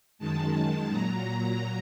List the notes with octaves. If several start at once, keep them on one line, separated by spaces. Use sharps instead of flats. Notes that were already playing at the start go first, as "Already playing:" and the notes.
F#2 D#3 G#3 A5
A#2 F#3 A#5
A#5